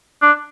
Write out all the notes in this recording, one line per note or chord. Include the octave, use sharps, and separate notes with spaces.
D4